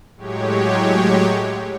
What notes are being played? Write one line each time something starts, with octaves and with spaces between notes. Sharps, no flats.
A2 F#3 G#3 G4 C#5